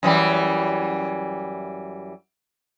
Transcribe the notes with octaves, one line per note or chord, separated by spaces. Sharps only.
F#2 E3 G3